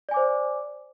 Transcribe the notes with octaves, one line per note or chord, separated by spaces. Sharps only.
C5 D5 G#5 D6